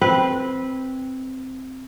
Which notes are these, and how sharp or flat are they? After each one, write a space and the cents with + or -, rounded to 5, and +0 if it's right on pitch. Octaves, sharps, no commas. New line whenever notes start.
C4 +0 B4 -10